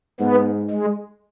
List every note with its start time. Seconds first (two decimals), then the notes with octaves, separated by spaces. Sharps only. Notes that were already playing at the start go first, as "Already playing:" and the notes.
0.20 G#2 B3
0.71 G#3